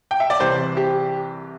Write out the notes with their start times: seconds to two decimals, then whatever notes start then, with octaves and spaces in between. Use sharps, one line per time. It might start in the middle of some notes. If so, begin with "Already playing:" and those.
0.11 G5
0.20 E5
0.30 D5
0.40 C2 C3 E3 C5
0.77 G4